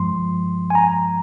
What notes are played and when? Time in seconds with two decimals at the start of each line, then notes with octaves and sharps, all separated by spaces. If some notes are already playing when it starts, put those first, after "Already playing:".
Already playing: G2 F3 G#3 C6
0.70 G#5
0.75 A#5